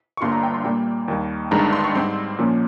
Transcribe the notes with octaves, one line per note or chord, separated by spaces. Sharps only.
C#6
G1 G2 G3 A#3 F4 C6
A#5
G5
C6
A#2 G3 A#3 G5
D#2 D#3 G3
G1 G2 D#3 G#3 A#5
C6
C#6
G#2 G3 C4 C6
A#2 F3 A#3 C#4